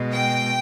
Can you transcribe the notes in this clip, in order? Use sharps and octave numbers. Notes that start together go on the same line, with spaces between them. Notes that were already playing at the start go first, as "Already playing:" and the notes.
Already playing: B2 G#3
G5